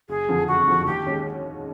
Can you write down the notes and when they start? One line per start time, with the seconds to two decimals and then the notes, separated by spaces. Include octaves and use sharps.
0.09 F#1 G#4
0.28 F2 D3 F3
0.48 F#1 F#4
0.67 F2 D3 F3
0.86 D#2 G4
1.06 D#3 G#3 C#4 F#4